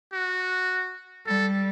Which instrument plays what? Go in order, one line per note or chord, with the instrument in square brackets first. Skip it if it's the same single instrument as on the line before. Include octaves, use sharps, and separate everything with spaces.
[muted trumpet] F#4
[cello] G3 [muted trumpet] A4